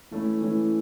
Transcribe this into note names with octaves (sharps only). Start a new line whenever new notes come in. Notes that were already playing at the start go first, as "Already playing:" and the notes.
E3 A3 C#4 E4
E3 A3 C#4 E4